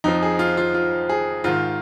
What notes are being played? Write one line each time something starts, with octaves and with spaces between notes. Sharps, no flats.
F2 F3 D#4
G#4
F4
F4
F4
G#4
G#2 D#3 F4